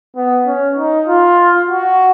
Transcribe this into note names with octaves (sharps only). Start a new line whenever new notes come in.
B3
C#4
D#4
F4
F#4